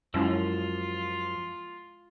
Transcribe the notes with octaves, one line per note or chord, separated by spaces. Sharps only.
F#2 F3 G#3 C#4 E4 F4